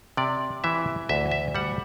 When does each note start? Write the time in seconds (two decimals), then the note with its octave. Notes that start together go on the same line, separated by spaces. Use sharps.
0.17 C3 D5
0.64 E3 E5
1.09 D2 E5
1.31 E5
1.55 G3 F#5